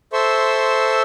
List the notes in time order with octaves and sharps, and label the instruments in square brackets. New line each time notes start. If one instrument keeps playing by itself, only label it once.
[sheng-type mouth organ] A4 C5 E5 C6 C#6 E6